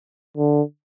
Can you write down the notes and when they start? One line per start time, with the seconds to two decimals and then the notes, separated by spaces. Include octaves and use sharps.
0.37 D3